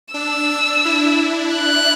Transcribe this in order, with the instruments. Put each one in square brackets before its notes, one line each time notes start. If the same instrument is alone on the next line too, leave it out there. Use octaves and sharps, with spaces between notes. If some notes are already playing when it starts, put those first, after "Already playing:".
[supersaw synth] D4 [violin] E6
[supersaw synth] D4
E4
[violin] F#6